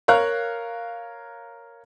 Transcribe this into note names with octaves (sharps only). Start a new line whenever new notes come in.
A#4 C#5 F5 A#5 F6 F#6